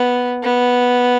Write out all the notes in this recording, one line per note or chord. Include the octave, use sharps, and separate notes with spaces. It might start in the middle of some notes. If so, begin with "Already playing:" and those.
Already playing: B3
B3